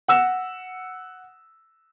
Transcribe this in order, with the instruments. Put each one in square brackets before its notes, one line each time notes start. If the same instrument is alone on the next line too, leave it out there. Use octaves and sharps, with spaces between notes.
[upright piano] F#5 E6 E7